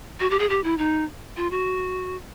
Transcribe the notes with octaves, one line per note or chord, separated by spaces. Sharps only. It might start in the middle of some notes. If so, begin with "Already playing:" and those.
F#4
G4
G#4
G4
E4
D#4
F4
F#4